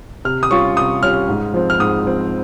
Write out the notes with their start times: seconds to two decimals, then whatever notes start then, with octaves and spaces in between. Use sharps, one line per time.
0.25 C3 F6
0.43 D#6
0.50 G3 C#4 F4 C#6
0.76 C3 D#6
1.02 G3 C#4 F4 F6
1.29 G#2
1.54 F3 C4
1.70 F6
1.80 G#2 D#6
2.06 F3 C4